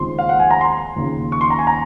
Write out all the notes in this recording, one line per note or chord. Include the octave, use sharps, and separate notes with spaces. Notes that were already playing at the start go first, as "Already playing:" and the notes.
Already playing: D#2 C#3 F3 G#3 C4 C6
F5
F#5
G#5
A#5
C6
D#2 C#3 F3
C#6
C6
A#5
G#5
A#5